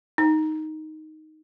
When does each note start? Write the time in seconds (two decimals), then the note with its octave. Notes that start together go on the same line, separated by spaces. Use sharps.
0.18 D#4